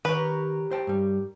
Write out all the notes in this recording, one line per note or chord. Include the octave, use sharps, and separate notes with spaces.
D#3 G4 A#4 B4 C#5
C5 G5 A5
G2 G3